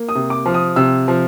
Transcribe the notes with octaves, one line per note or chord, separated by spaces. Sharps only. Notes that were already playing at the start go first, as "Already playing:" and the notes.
Already playing: A#3
D#6
C3
D6
F3
D#6
C3 E6
F3